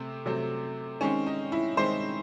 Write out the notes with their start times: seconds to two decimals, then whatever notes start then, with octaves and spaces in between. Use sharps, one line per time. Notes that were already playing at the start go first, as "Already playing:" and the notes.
Already playing: C3 A3 C4
0.25 C3 F#3 A3 C4
1.01 D#3 G#3 C4 C#4
1.26 D#4
1.52 E4
1.77 D#3 G#3 C4 C5